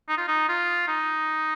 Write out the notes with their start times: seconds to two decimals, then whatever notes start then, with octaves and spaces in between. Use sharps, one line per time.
0.09 D#4
0.18 F4
0.28 D#4
0.49 F4
0.87 D#4